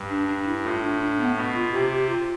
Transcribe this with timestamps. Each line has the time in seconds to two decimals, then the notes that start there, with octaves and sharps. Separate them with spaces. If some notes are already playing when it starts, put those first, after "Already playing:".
Already playing: G2
0.09 D4
0.28 D4
0.47 E4
0.64 A2 F4
0.82 D4
1.01 D4
1.19 B3
1.37 B2 B3
1.55 F4
1.73 C3 G4
1.91 G4
2.09 F4